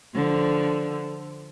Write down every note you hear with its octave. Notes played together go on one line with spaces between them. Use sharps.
D3 F3